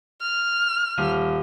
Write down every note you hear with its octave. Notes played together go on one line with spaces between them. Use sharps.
F6
D#1